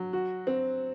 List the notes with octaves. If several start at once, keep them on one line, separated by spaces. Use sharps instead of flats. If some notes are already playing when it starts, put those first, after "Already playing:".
Already playing: F#3
F#4
C4